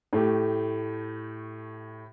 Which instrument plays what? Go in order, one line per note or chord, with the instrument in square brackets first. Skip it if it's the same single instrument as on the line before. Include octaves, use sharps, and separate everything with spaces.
[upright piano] A2 A3 G4